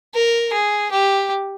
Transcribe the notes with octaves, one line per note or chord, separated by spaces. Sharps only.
A#4
G#4
G4